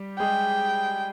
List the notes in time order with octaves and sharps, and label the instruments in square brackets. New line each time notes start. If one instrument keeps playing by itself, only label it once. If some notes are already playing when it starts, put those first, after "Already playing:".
Already playing: [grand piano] G3 G4
[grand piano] G#3 G#4 [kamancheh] G5